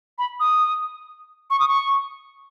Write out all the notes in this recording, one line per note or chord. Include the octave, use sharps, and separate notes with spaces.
B5
D#6
C#6
D#6
C#6